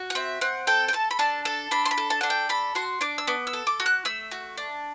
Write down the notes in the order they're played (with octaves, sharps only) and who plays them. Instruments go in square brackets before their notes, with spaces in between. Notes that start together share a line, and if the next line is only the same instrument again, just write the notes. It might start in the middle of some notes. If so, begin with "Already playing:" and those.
Already playing: [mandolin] F#4
F#5
C4 E5
C4 F#5
A4 G5
G5
A4 A5
B5
D4 A5
A4 A5
D4 B5
C6
B5
A4
A5
D4 F#5
G5
A4 B5
F#4 C6
D4 D6
E6
B3 D6
E6
A4
D6
F#4
F#6
A3 E6
F#4
D4